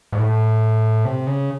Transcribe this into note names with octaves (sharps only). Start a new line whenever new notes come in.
G#2
A2
C3
C#3